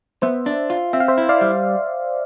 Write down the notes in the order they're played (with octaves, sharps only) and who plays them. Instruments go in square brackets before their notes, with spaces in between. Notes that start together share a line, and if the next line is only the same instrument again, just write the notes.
[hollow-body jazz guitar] B3 [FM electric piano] C5 E5
[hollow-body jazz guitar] D4
F4
[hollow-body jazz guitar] C4 [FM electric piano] E5
[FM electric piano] F5
C5 E5
[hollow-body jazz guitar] E4
[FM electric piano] D5 F5
[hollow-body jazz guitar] G3